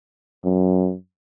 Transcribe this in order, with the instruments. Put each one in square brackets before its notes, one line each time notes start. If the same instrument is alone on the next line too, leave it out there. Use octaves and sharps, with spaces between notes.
[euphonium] F#2